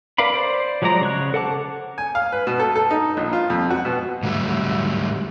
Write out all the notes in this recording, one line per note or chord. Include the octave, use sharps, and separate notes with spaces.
A#4 B4 D5 F5 B5
C5 D5
F3 F#3 G#3 D5 A#5
C#3 C#5 F#6
A4 C5 F#5 A5 D6
G#5
F5
B4
B2
A4
A4
D#4
A#1
F4
F2
F#4
B2
G#2 D3 F#3 G3 A3